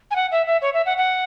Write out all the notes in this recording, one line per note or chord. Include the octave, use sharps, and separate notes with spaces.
G#5
F#5
E5
E5
C#5
E5
F#5
F#5